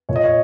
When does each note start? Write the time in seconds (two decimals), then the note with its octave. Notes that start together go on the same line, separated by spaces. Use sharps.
0.09 A#2 C#5
0.16 D#5
0.24 C#5